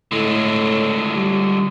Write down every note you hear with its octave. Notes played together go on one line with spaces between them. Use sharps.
A2 D3 G#3
G3